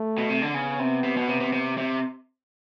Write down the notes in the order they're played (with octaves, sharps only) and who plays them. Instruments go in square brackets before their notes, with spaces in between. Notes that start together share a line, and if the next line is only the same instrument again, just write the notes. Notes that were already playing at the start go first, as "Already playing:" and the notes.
Already playing: [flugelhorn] A3
[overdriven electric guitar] B2
C3
D3
[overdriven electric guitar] C#3 [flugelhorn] B3
[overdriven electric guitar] C3
C3
B2
C3
C3
C3
C3